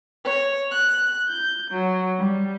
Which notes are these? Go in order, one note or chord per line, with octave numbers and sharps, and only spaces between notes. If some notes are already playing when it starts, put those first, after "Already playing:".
C#5
F#6
G6
F#3
G3